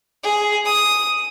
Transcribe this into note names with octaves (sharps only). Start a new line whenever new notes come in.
G#4
D#6